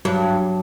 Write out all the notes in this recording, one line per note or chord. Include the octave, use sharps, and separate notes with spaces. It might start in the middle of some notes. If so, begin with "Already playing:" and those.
G2 F#3